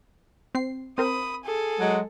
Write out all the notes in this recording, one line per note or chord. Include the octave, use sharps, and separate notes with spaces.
C4 C7
C4 A#4 C5 B5 D#6
G#4 A4
F#3 G#3